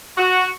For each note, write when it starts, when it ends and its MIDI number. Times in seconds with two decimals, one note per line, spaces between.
0.17 0.48 66